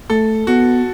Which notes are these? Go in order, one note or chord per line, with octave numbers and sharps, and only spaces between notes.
A3 A4
B3 F#4